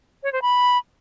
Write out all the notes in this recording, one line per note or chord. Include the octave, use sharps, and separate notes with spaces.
C#5
C5
B5